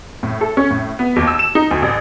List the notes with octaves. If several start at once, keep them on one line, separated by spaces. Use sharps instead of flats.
A2
A4
C#4
A2
B3
D#2
E6
E7
D#4
D2
A1